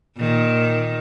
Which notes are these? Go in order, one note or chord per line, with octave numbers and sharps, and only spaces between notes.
A#2 D#3